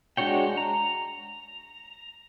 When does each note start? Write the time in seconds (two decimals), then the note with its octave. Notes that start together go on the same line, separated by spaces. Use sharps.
0.17 G#3 D4 F#4 C#5 G5
0.57 A#5